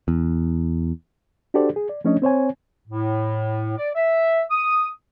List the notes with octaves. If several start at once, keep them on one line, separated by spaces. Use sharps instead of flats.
E2
D4 F#4 G4 A4 C5 D5
G#4
D5
F3 A3 C#4 D4 C#5 D#5
C4 C5 C#5 G#5
A2
D5
E5
D#6